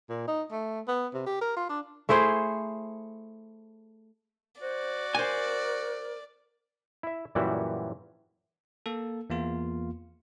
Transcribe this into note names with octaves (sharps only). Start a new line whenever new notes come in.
A#2
D#4
A3
B3
C3
G4
A#4
F4
D4
A3 E4 G#4 C5
F#4 C5 D5
A#4 C5 G#5
E4 E5
F#2 A#2 E3 G3 E4 F#4
A#3 A4
E2 A#3 F4